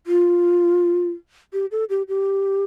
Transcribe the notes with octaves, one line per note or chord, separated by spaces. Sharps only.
F4
G4
A4
G4
G4